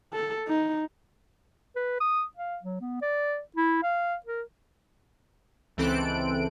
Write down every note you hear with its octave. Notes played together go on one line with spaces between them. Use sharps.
A4
D#4
B4
D#6
F5
F#3
B3
D5
E4
F5
A#4
C#2 E3 C4 A4 F#6 D7